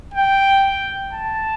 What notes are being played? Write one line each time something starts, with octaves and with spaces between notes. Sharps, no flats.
G5
A5